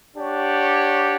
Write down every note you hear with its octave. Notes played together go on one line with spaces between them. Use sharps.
D4 G4 C#5 F#5